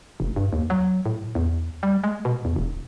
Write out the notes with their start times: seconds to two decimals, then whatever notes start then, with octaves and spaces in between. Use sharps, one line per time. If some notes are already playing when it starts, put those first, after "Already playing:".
0.20 F1
0.36 G2
0.53 D#2
0.70 F#3
1.06 A2
1.35 E2
1.83 G3
2.04 G#3
2.25 B2
2.45 E2
2.56 E1